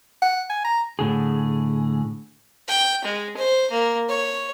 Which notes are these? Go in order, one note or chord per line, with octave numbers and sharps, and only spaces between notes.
F#5
G#5
A#5
A2 D3 G#4
G5
G#3
C5
A#3
C#5